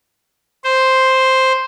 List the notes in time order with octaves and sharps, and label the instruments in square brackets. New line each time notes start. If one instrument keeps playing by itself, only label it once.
[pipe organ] C5